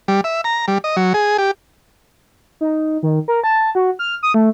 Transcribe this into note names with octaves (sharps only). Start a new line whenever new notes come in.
G3
E5
A#5
G3
D#5
F#3
G#4
G4
D#4
D#3
A#4
A5
F#4
F6
D#6
A3